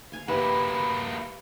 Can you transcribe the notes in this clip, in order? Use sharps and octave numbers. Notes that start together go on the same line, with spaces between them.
F5 G#5
A#3 E4 G4 B4